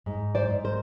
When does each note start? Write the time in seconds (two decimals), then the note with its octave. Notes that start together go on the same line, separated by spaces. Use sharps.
0.06 G#2
0.35 C5 D5
0.50 G#2
0.64 A#4 C5